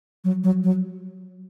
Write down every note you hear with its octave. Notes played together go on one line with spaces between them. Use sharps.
F#3
F#3
F#3